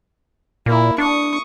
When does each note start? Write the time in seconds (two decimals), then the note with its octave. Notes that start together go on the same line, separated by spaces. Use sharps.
0.66 A#2 A#3 E4
0.98 D4 C#6 D#6